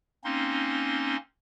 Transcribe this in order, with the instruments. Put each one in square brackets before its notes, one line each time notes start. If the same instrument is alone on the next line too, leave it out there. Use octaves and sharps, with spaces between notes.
[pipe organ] A#3 C4 C#4 D#4 C6